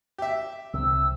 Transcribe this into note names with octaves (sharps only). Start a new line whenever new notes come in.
G4 E5
C2 C3 C4 E6